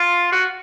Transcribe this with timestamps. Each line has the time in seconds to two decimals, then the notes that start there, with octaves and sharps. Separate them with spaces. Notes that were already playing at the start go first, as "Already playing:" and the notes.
Already playing: F4
0.32 F#4